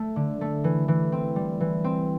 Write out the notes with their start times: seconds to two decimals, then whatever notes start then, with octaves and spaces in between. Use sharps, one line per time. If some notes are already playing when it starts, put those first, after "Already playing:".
Already playing: A3
0.16 D3
0.41 A3
0.64 E3
0.88 E3
1.12 C4
1.36 G3
1.60 E3
1.84 C4